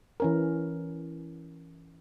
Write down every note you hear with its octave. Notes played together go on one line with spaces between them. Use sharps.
E3 C#4 A#4